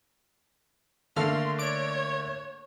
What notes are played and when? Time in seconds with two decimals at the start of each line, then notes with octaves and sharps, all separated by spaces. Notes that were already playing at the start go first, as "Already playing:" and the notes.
1.16 D3 A3 A#3 A4 F5 C6 F6
1.59 C#5 D5 D7